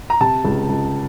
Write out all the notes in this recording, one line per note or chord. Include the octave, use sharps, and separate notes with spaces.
A#5
C3 A5
C#2
C#2